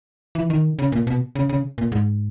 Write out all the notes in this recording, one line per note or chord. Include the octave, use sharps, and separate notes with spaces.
E3
D#3
C#3
A#2
B2
C#3
C#3
A#2
G#2